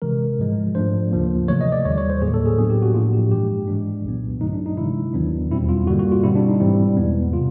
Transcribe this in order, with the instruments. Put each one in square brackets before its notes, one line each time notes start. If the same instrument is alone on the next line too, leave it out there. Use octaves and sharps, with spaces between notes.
[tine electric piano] C3 E3 G#3 A#4
G#2 F3 G#3
G#2 F3 A3 D4 C5
D2 C#3 F3 A#3
C3 E3 A3 C#5
D#5
D5
D#2 D3 G3 C#5
C#5
C5
A2 F#3 A#3 G#4
A4
G#4
A2 F#3 B3 D4 G#4
G4
F#4
A2 F3 A#3 D4 F4
G4
G2 E3 G#3 G4
G#2 E3 G#3 D4
C2 A#2 F#3 B3
G2 D3 F#3 A3 D#4
D4
D#4
C3 E3 G#3 E4
D#2 D#3 F#3 B3 D4
E2 B2 G3 C4 E4
F4
G2 D3 G3 A#3 F#4
F#4
F4
B2 G3 C4 E4
D4
D#4
G#2 E3 G3 C4 E4
E2 B2 G#3 B3
C3 F4